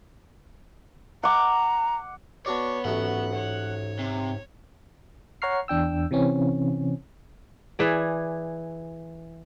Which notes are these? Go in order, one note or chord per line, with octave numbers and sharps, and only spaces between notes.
F#5 A#5 D6
B3 D4 F#4 C#5 D5
A1 G#2 F#3 A3 F#5
C#5
C3
C#5 F#5 A#5 C#6 F6 C7
E2 D4 G5 E6
C3 E3 C4 C#4
E3 G#4 D5